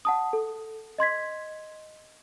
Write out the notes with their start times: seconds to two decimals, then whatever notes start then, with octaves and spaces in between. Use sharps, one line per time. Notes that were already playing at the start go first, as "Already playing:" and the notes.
0.05 F#5 A5 D#6
0.33 A4
0.98 D#5 C6 G#6 B6